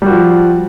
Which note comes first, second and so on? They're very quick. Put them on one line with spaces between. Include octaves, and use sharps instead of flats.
G3 F#4 F3